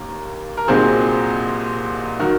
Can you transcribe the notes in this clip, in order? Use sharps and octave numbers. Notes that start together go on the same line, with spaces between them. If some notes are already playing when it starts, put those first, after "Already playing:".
Already playing: D#2 D#3 A#3
A#4
C2 A#2 F#3 C4 D#4 G#4 C5
D#3 F#3 F#4 A#4